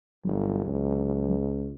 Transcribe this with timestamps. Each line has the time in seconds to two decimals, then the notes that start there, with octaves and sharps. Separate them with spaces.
0.25 G1 F#3
0.65 C#2